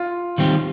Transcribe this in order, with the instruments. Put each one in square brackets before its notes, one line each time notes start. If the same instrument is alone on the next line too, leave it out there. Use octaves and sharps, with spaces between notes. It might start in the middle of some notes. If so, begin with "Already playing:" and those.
Already playing: [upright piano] F4
[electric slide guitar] D#3 G3 C4 G4